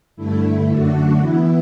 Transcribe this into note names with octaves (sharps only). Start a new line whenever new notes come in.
G2 D3 A3 E4
F#2 D3 A3 D4 F#4
E3 B3 E4